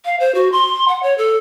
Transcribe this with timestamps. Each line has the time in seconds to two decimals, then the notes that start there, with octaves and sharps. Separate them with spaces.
0.05 F5
0.20 C5
0.35 F#4
0.52 C6
0.88 F#5
1.03 C#5
1.18 A4